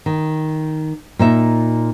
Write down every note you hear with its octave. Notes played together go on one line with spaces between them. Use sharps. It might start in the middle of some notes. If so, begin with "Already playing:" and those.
D#3
A#2 D#4 E5